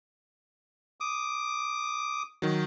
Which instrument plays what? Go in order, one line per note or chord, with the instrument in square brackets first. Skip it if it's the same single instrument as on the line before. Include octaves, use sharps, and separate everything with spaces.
[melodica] D6 D#6
[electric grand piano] D#3 F#3